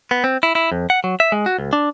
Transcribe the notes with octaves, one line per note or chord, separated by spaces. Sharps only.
B3
C4
E4
E4
F2
F#5
F#3
E5
G#3
F#4
C#2
D4